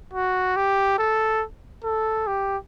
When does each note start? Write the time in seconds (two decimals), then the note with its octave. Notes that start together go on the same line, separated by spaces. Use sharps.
0.14 F#4
0.56 G4
0.99 A4
1.84 A4
2.27 G4